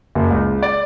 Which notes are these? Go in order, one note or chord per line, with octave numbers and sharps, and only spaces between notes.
F#1
C#2
D5